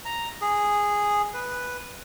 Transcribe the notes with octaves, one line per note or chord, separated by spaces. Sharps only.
A#5
G#4
B4